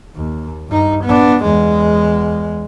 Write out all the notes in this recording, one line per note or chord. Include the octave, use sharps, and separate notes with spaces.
D#2
G2 D#4
B3 D4
E2 G#3